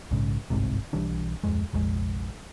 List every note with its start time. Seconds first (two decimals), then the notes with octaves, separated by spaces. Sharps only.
0.11 A#1 G#2 C#3
0.50 G1 C2 G#2 C3
0.93 B1 E3 G3 D4
1.44 D1 F2 G#3
1.73 F1 A#1 F2 G#3